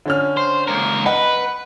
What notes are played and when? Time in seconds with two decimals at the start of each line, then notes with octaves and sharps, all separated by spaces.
0.06 D3 C#4 F6
0.37 C5
0.68 C#2 A#4
1.06 B4 D#5 F#5